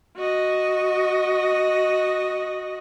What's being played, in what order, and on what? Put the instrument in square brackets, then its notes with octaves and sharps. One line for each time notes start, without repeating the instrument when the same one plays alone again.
[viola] F#4 D#5